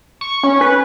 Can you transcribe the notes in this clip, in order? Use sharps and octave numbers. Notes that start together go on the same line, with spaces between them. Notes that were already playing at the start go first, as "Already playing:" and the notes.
C#6
C#4
B4